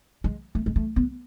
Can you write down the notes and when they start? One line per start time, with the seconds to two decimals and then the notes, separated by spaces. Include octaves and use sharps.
0.24 G#3
0.55 A3
0.66 G#3
0.76 A3
0.96 B3